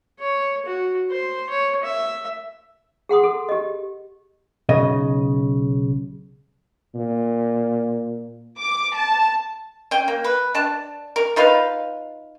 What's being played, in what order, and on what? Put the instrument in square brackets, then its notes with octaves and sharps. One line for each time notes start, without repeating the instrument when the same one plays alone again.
[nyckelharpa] C#5
F#4
C5
C#5
E5
[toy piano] G#4 F#5 C6 D#6
A4
G4 D#5
[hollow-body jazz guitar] B1 C#3 D#5
[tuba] A#2
[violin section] D6
A5
[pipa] C#4 G5
A#3
B4
D4 A5
A#4
D#4 F4 B4 F5